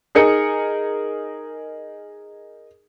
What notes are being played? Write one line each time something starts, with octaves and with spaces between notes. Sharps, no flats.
D#4 G#4 A#4 C#7